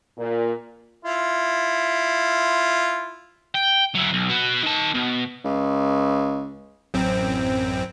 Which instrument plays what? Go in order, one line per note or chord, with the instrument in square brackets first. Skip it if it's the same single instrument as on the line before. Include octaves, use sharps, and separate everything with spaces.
[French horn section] A#2
[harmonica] E4 F4
[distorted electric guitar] G5
F#3 E4
B1
F#4 B4
D#3 A5
B2
[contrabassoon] C#2
[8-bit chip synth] A1 F#2 C4